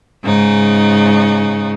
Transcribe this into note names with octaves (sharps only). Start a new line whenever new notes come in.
G#2 C#3 D#4